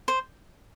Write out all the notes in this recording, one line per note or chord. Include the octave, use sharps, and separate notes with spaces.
C5